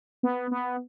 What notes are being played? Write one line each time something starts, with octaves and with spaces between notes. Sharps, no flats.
B3
B3